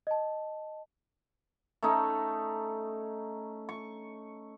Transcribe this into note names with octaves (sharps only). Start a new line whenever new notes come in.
D#5 A5
A3 C#4 D#4
C#6